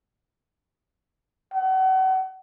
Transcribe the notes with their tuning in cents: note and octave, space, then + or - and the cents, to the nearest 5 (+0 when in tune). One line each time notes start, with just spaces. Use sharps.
F#5 +35